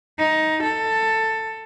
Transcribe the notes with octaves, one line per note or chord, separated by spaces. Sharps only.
D#4
A4